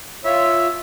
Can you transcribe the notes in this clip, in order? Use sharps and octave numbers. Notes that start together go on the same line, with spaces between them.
F4 C#5 E5